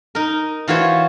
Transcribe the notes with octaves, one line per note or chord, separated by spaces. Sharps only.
D#4 A#4
E3 F4 F#4 C5 C#5